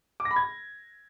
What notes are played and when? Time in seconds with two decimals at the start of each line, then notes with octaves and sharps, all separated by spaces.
0.20 D6
0.25 A#6
0.31 B5
0.36 G#6